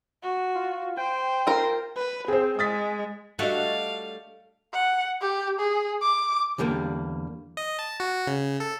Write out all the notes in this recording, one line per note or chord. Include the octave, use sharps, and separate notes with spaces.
F#4
F4
C5 G5
F4 A#4
B4
C4 G#4 C5
G#3 D#6 A6 B6
G3 A3 D4 F#4 A4 D#5 F5
F#5
G4
G#4
D6
E2 D3 G3 A#3
D#5
A5
F#4
C#3
A4